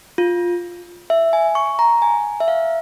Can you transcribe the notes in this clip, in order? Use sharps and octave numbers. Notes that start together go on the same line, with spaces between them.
F4
E5
G#5
C#6
A#5
G#5
E5
F5